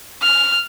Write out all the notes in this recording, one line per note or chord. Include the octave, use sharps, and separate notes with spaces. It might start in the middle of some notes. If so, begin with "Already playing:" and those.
F6